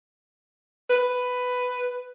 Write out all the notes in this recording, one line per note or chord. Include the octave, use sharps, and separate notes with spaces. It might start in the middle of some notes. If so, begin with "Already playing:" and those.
B4